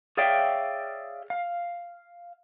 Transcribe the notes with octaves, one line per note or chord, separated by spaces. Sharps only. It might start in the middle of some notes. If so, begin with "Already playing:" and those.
G#4 C#5 D5 E5 F5 G5
F5